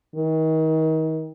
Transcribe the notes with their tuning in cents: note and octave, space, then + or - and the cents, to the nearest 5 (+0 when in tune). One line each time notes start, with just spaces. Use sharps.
D#3 +35